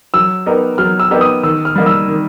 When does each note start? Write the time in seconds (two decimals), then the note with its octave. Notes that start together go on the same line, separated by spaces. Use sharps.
0.14 F#3 E6
0.46 B3 D#4 G4 A#4
0.78 F#3 F6
1.00 E6
1.11 B3 D#4 G4 A#4
1.21 D#6
1.43 D#3 E6
1.65 F6
1.76 G3 A#3 D#4
1.86 E6
2.08 D#3